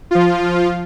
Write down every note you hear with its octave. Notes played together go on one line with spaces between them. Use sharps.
F3 F4